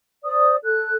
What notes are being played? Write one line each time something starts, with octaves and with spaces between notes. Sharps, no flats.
C5 D5 D#6
A4 F#6